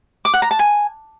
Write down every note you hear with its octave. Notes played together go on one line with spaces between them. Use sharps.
D6
F#5
A#5
A5
G#5